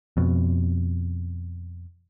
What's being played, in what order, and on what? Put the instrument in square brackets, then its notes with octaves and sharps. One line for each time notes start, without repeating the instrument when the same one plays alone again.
[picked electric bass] F2 B2